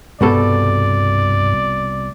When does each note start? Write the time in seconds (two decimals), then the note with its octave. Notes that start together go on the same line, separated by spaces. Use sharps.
0.21 C2 G2 B2 A4 D5